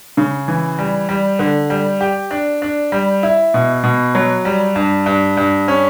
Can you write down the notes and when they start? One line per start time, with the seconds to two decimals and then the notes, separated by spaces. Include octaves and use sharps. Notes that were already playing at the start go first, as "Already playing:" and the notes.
0.17 C#3
0.48 E3
0.78 G3
1.09 G3
1.39 D3
1.70 G3
2.01 G4
2.31 D4
2.62 D4
2.92 G3
3.23 E4
3.54 B2
3.83 B2
4.15 F#3
4.45 G3
4.76 G2
5.06 G2
5.37 G2
5.68 C#4